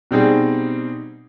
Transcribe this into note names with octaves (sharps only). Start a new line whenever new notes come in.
B2 G3 C4 D#4 G#4